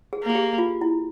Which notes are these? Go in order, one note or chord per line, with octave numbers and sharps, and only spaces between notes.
G#4
A#3
G#4
G4
F4
E4